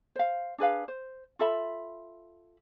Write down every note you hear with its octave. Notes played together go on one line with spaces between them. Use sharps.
C5 F5
D4 G#4 B4 F5
C5
F4 A4 E5 B5